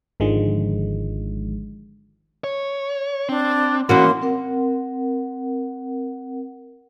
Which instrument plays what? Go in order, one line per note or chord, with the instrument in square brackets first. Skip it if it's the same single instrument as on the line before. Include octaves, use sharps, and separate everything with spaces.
[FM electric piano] G#1 D3 D#3 F3 G#3
[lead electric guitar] C#5
[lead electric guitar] C4 [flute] D4
[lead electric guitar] E2 [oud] A#3 C#4 E4 [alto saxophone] F#4 [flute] C6
[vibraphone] C4 A#4 F#5